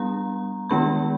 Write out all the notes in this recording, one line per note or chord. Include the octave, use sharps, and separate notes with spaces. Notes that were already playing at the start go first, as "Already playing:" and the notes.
Already playing: G3 B3 D4 A#5
D#3 G#3 B3 D4 B5